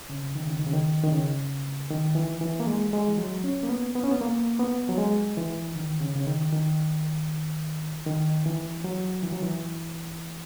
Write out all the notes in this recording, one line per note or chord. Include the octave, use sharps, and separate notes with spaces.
C#3
D#3
C#3
D#3
C#3
D#3
D#3
C#3
D#3
E3
E3
A#3
G#3
G#3
E3
F#3
C#4
A#3
B3
B3
C#4
B3
A#3
B3
F#3
G#3
E3
D#3
C#3
C#3
D#3
D#3
D#3
E3
F#3
E3
F#3
E3